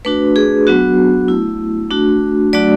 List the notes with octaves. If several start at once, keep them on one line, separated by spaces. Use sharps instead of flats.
A3 D4 F#4 B4
G#4
F#3 B3 D4 F#4
A3 E4
A3 D4 F#4
F#3 A3 D4 F#4 D5